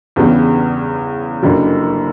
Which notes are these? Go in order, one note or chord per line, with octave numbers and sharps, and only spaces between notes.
E2 C#3 G3 B3 D4
F#1 F#2 D3 G3